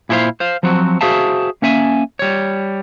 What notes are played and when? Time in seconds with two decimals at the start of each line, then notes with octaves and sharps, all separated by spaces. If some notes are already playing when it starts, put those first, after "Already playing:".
0.09 A#2 E4 G4 A4 C5 F5
0.40 C5 F5
0.63 F3 F#3 C4 F#4
1.01 F#4 G#4 C5 E5 F5 A5
1.62 A#3 C#4 E5 G#5
2.19 G3 C#5